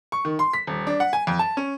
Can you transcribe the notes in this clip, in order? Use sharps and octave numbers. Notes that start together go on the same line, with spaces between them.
C#6
D#3
C6
B6
D#1
D4
F#5
G#5
F2
A5
C#4